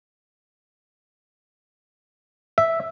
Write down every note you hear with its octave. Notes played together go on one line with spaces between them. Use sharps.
E5